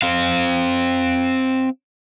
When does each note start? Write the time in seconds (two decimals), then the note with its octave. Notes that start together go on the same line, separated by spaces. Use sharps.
0.02 C4 F5